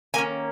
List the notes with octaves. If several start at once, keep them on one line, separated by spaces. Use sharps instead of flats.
D#3 A#3 C#4 G#5